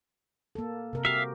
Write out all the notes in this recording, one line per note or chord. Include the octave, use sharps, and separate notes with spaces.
A#3 A4
C3 A#4
F#4 G4 E5 F5